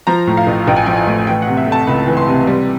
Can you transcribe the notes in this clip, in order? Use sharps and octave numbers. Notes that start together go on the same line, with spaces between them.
F3 A#5
A2
F5
A1
A1 G5
G#5
F3 G5
G#5
A2
E3 G5
F#5
C3
E5
A3
A5
C#2 B5
E3
C6
C3
G3